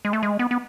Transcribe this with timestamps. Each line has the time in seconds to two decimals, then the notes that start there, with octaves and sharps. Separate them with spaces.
0.05 G#3
0.13 A3
0.23 G#3
0.39 B3
0.51 B3